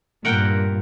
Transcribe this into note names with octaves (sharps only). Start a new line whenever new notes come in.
G2 A#2 A#4 F#5 G5